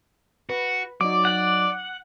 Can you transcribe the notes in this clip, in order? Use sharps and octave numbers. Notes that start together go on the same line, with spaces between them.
F#4 B4
F#3 D#4 D5 D6
F#5